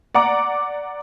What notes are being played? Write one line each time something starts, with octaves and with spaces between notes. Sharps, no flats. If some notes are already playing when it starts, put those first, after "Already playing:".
D5 F#5 A#5 D6